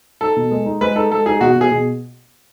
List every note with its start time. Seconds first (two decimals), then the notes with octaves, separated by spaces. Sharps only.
0.21 D#4 A4
0.36 B2
0.51 G#3
0.66 D#4
0.81 G#3 B4
0.95 D#4 A4
1.11 G#3 A4
1.26 D#4 G#4
1.41 B2 F#4
1.56 B2
1.61 G#4
1.71 B2